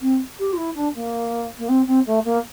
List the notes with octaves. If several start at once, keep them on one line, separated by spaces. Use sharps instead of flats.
C4
G4
F4
E4
D4
A#3
A#3
C4
C4
A3
A#3